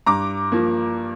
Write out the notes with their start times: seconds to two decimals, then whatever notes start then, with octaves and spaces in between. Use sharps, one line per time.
0.06 G2 A#5 D6
0.52 F3 A#3